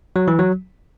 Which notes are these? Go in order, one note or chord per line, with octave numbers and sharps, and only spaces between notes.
F#3
E3
F#3